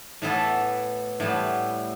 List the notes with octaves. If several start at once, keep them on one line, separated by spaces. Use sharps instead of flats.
A2 E3 B3 E4 A4
A2 E3 G3 B3